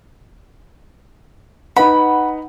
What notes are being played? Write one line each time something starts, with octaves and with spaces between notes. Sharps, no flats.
D#4 B4 F#5 B5